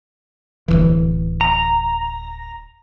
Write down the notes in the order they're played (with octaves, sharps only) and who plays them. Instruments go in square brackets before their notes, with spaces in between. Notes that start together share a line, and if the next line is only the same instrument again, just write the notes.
[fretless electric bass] D1 G#1 E3
[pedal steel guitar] A#5